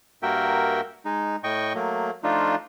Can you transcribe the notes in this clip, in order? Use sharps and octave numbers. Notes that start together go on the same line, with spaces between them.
G2 A#3 F#4 A#4 E5 G5
G#3 D#4
A2 D#5 G5 C#6
F#3 A3 A#3
F3 A3 D4 D#4 F4